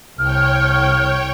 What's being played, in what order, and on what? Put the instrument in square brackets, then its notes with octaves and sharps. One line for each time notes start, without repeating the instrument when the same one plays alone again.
[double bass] C2 [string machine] C#5 G5 [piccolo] F6